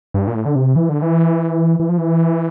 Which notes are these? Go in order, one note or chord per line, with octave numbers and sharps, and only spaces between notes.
G2
A#2
A2
D3
C3
E3
D3
E3
E3
F3
E3